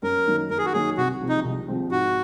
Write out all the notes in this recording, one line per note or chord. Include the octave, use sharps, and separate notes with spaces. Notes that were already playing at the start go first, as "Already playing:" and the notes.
F#2 A#4
D#3 F#3 A#3 D#4
F#2 A#4
G#4
F#4
D#3 F#3 A#3 D#4 G#4
C2 F#4
C3 F3 G#3 C4
D#4
C2
C3 F3 G#3 C4
G#2 F#4